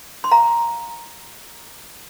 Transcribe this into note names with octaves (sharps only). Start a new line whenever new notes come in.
C6
F5 A#5